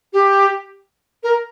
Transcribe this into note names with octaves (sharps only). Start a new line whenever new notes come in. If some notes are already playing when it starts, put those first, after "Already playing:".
G4
A#4